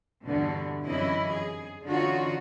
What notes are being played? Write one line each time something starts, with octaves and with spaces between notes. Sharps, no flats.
E2 G2 B2 D3 E3
F#2 C3 E3 C#4 E4 D#5
G#4
D3 E3 C#4 D#4 F4 F#4